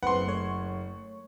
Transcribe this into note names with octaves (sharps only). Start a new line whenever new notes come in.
F#1 C4 B4 F#5 C6
A3 C#5